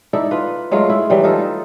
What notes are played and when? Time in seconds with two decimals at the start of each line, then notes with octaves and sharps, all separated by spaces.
0.13 D#4 E4 A4 D5
0.31 F4 B4
0.71 F#3 G#3 A3 F4
0.90 E4
1.10 E3 F#3 G3
1.24 D#4 F4 A4